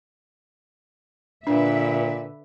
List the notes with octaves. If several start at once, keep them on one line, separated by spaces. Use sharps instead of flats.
A#2 D3 D4 B4 E5